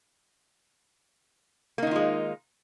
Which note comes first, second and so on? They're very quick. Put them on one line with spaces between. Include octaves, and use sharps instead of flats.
A#3 D#4 D#3 F4 G#3